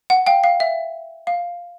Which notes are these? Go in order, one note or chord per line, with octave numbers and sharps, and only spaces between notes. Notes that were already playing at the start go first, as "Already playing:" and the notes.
F#5
F5 G5
F5
E5
F5